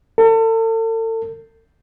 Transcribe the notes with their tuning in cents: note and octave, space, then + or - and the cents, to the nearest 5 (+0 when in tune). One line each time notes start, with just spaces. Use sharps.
A4 +40